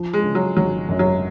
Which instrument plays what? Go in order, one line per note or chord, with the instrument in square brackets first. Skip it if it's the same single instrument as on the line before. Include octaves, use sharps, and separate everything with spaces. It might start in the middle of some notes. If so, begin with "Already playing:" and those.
Already playing: [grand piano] F3
[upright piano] G#3
[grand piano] C#3
[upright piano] F#3
[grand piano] G#1 [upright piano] F#3
[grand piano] F#2
[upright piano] F#3